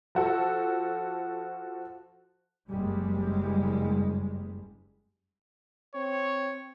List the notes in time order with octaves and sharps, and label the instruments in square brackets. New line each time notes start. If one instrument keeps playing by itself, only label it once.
[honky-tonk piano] F3 F#4 A4
[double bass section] F#1 F#2 G3 G#3
[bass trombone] C4 [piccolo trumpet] C#5